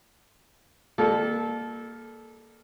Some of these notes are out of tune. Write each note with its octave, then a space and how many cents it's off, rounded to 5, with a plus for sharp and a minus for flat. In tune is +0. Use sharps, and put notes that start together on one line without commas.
G3 +35 A#3 +0 A4 -20